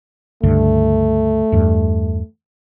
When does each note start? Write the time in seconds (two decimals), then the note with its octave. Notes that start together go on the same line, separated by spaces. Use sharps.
0.43 C#2 G2 D3 A3
1.52 E2 G2